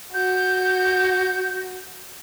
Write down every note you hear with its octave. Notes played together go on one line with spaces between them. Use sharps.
F#4 G6